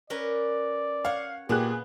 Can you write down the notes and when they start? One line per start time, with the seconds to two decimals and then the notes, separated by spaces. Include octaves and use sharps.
0.10 C#4 A#4 B4 D5
1.05 C#5 F5 F#5
1.49 A#2 B3 G4 G#4 F#6